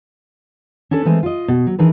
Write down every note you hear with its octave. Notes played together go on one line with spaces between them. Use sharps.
C#4 D4 A4 B4
E3 G#3 A3 C4 G#5
F4 D#5
B2
F#3
E3 D4 D#4 G#4 A#4 B4